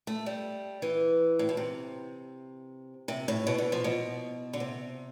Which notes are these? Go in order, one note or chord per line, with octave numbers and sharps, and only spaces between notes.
A3
G3
E3
A2
B2
C3
C3
A2
B2
D3
F3
B2
D3
C3